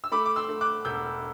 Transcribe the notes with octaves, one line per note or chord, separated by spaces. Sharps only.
E6
A3 B5 D6
D6
C6 E6
A3
D6 F#6
E1 E6 G6